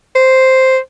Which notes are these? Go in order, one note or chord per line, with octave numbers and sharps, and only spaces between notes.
C5